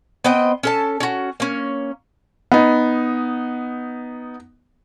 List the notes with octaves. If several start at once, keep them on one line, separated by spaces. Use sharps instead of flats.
B3 C4 D#5 G5
C#4 A4 A5
C#4 F#4
A#3 C#4
B3 D#4